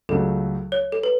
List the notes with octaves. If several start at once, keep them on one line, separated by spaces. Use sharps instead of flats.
C#2 C#3 F#3 A3 A4
C#5
A4
B4